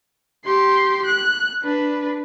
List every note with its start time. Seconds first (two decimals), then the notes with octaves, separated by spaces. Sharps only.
0.45 G4 C6
1.06 F#6
1.63 D4 B4